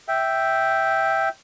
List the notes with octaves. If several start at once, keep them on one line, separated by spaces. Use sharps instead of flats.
E5 G5